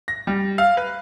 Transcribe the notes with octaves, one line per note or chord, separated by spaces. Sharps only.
A#6
G3
F5
B4